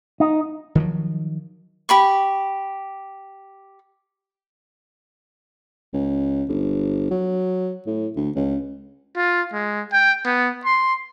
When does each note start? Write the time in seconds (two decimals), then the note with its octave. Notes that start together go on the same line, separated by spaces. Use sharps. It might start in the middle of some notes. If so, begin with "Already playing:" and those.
0.20 D#4
0.75 D#3 F3 F#3
1.89 G4 B5 C#6
5.93 C#2
6.49 G1
7.11 F#3
7.87 A2
8.16 D2
8.35 C#2
9.17 F4
9.53 G#3
9.92 G5
10.25 B3
10.65 C6